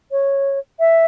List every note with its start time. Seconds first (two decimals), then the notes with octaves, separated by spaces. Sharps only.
0.11 C#5
0.80 E5